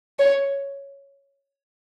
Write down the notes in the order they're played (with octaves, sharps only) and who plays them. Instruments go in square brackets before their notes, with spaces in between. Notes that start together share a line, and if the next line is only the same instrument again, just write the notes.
[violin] C#5